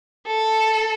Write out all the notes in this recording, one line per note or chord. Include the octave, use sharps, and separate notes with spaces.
A4